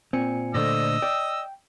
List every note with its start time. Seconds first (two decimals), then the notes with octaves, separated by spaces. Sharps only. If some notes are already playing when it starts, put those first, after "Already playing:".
0.13 A#2 C4 G#5 C#7
0.54 A#2 D3 A3 C5 D5 D#5 E6 A#6
1.02 D5 G5